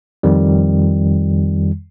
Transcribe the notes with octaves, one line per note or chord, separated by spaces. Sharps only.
F2 D#3 G3